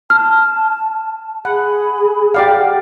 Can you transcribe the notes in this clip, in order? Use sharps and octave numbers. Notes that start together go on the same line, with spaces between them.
A5 F6
G#4 F#5 B5
G4 D5 F5 F#5